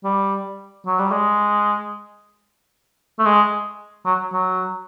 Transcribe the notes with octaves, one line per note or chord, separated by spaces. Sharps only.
G3
F#3
G3
G#3
A3
G#3
F#3
F#3